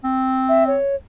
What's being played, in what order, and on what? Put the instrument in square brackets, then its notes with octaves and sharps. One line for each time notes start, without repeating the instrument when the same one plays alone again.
[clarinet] C4
[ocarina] E5
C#5